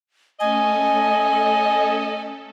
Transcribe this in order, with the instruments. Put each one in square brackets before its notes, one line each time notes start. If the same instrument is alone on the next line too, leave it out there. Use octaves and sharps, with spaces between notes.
[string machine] A3 C#4 A4 [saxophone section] D#5 [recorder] G#5